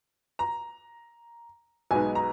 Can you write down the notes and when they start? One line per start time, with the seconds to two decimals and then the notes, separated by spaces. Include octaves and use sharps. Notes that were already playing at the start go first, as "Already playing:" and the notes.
0.39 A#5
1.91 B1 B2 G#3 B3 D#4 G#5
2.15 A#5